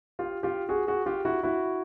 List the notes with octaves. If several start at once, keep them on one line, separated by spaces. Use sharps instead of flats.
F4 G4
F4 G4
F#4 G#4
F#4 G#4
F4 G4
E4 F#4
E4 F#4